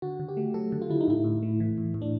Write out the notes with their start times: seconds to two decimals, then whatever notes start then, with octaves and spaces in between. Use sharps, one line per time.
0.02 D3 F#4
0.20 D3
0.29 G4
0.37 A3
0.54 F#3 A4
0.72 D3
0.82 F4
0.90 D3 E4
1.01 D#4
1.08 A2 E4
1.24 A2
1.43 A3
1.60 E3
1.78 A2
1.94 A2
2.02 D4